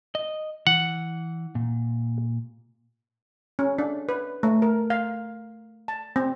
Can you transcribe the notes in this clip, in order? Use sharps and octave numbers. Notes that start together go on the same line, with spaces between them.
D#5
E3 F#5
A#2
C#4
D4
B4
A3
A#4
F5
A5
C4